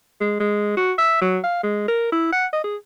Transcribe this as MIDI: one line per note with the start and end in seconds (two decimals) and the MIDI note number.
0.21 0.38 56
0.40 0.74 56
0.77 0.93 66
0.98 1.17 76
1.21 1.38 54
1.44 1.62 77
1.63 1.85 56
1.88 2.09 70
2.12 2.29 64
2.32 2.46 78
2.53 2.61 75
2.64 2.76 68